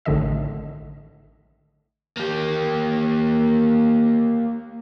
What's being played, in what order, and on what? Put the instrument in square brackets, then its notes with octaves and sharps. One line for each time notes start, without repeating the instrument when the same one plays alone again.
[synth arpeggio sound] A1 A2 D3 D#3 D#5 E5
[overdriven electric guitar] A#3 G4